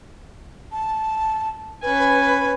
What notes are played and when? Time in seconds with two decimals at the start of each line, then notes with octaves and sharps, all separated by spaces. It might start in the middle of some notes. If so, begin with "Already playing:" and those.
0.72 A5
1.83 C#4 B4 G#5